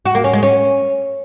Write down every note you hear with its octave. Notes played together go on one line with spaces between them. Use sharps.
F#4
A#3
C#4
G#3
C#4